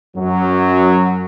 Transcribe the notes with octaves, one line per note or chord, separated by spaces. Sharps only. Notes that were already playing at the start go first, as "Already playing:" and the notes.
F#2 F#3